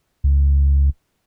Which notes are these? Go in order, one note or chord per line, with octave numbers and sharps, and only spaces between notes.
C#2